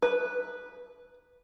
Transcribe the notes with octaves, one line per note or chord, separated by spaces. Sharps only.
B4